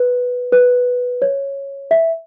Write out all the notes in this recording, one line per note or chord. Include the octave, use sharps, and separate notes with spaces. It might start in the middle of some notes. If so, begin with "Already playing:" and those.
Already playing: B4
B4
C#5
E5